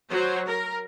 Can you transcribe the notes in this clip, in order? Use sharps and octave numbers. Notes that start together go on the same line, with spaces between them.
F#3 C5 C#5
A#4